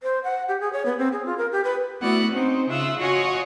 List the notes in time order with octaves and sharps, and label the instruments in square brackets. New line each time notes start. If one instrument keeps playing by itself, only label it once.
[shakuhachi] C5
F#5
G4
G#4
C#5
B3
C4
G#4
F4
A#4
G4
B4
[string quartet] A3 B3 E4 F#4 D5 F#5
C4 C#4 D#4 C5
C#3 F4 E5 F#5 E6
F4 F#4 C#5 D#5 F#5 G#5